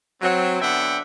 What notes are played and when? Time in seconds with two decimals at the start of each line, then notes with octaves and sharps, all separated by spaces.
0.22 F#3 C4
0.62 D3 B3 D4 E5 F#5 G5